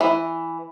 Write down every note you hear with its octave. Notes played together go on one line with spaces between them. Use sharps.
E3